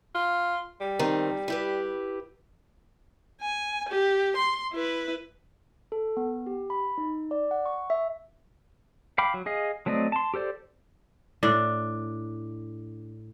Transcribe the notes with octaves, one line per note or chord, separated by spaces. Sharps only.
F4
G3
D#3 C4
E4 G4 B4
G#5
G4
C6
E4 B4
A4
B3
G4
B5
D#4
D5
F#5
C#6
E5
F5 G5 B5 D6
F#3
G#4 D#5 F5
F#3 A3 C4 D5 D#5
A5 C6
G4 A4 C5 D5
A2 D4